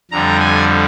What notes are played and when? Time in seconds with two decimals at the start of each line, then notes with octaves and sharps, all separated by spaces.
0.11 F2 D3 G3 A#5
0.40 G#5